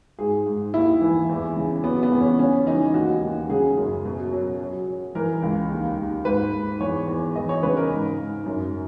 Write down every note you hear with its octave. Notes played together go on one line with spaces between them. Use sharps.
G#2 G#4
G#2
D#2 E4
E3
E2
C#3
F#3 B3
B3
E2
C#4
C#3 C#4
E3 D#4
D#2 F#4
D#2
C#3 G#4
F#2
B2
F#3
F#3
F#3
E3 A#4
C#2
D#2
D#2
G#2 B4
G#2
E2 C#5
E2
E3 D#5
C#5
C#3 B4
A#4
G#2
G#2
F#2